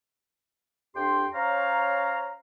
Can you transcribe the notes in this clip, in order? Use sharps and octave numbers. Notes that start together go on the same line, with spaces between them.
F2 D4 G4 G5 C6
C#4 C5 C#5 F5 A#5